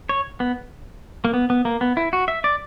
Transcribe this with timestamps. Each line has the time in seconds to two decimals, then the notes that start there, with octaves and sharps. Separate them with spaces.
0.09 C#5
0.40 B3
1.25 A#3
1.34 B3
1.50 B3
1.65 A#3
1.81 B3
1.97 E4
2.13 F#4
2.28 E5
2.44 D5